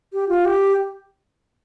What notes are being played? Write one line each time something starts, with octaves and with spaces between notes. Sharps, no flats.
G4
F4
G4